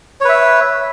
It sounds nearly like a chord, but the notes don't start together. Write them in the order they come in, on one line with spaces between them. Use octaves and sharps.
C#5 B4 E5